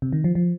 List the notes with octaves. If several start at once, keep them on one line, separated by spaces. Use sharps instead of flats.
C3
D#3
F3
F3